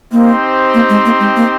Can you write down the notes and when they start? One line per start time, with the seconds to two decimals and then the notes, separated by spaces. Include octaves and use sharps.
0.12 A#3 C4 D#4 G4 C5
0.74 A#3
0.90 G#3
1.05 A#3
1.20 G#3
1.36 A#3